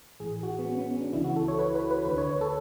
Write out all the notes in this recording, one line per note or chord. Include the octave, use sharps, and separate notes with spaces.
A1 A2 E3 G#4
F#4
B3
C#4
B3
C#4
D4
C#2 C#3 E3 E4
F#4
A4
C#5
B4
B4
B4
D2 D3 B4
C#5
B4
A4